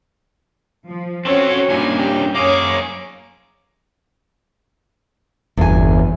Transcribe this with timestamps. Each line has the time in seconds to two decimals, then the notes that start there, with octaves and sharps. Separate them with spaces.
0.88 F3
1.25 C4 C#4 F#4 A4 C#5
1.69 G2 A#2 A#3 C#4 D#4 G#5
1.99 G4
2.35 F#2 A#3 G#4 C#5 D6
5.57 G1 E2 G#5